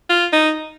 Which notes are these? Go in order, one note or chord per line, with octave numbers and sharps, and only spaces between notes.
F4
D#4